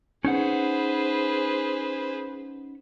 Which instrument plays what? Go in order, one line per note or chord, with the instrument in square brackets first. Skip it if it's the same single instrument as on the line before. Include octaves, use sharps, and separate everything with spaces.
[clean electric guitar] C#4 D#4 F#5 [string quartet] G#4 B4 C5